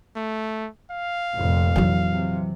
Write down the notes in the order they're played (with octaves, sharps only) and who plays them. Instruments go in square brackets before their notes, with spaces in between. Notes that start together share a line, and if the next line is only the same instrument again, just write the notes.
[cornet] A3
F5
[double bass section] F1 F2 A#2
[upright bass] E3 F#3
[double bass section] C3